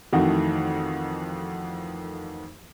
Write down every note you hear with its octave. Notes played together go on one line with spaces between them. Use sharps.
F2 D#3 E3 A3 F#4 F#5